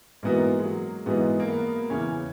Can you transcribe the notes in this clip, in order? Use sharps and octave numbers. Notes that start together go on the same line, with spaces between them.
G#2 E3 A#3 B3 F#4
G#3
F#3
G#2 E3 G#3 B3 F#4
A#3
B3
E2 C#3 E3 C#4